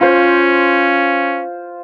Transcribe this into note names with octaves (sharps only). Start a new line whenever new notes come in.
C#4 F4 C5